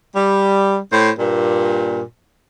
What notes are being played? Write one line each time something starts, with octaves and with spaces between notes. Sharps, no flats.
G3
A2 C5
G2 A#2